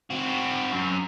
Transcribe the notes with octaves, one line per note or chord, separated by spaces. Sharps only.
C4 F#4
F#2